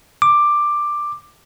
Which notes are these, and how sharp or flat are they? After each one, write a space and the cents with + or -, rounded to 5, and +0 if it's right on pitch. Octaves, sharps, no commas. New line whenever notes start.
D6 +10